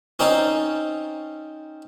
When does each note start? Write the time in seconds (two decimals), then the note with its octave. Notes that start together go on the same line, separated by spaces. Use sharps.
0.19 C4 C#4 D#4 C5 D5